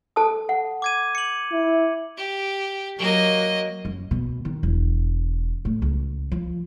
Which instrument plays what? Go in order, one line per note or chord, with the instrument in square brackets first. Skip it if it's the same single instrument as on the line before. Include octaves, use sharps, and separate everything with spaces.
[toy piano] A4 A5 D#6
F#5
[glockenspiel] D6 G#6 D#7
C#7 F#7
[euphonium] E4
[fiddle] G4
[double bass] F#3 [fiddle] A#3 D#5
[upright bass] F#2
B2
D#3
E1
A2
C#2
F3